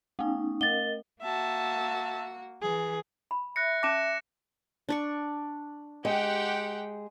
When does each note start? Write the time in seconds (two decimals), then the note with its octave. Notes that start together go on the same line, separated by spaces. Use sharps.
0.19 A3 B3 C#4 D#4
0.61 A3 A#4 D#5 A6 G7
1.22 A#3 F#4 E5 A5
2.62 E3 G#4
3.31 B5
3.56 E5 F#6 A#6 C#7
3.83 C#4 A5 D6 A#6 E7
4.89 D4 D5 C#6
6.05 G#3 G4 F#5 G5